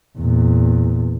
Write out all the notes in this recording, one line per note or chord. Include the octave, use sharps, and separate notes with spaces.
E2 A#2